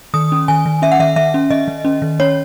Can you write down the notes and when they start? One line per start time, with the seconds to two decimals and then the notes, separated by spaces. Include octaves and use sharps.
0.14 D#3 D#6
0.32 C#4
0.48 D#3 G#5
0.66 D#3
0.82 C#4 E5
0.92 F#5
1.00 D#3 E5
1.16 D#3 E5
1.34 C#4
1.50 D#3 D#5
1.68 D#3
1.85 C#4
2.02 D#3
2.20 C#4 C#5